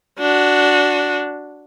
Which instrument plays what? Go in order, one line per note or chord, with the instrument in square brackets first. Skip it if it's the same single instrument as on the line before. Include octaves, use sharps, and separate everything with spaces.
[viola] D4 F#4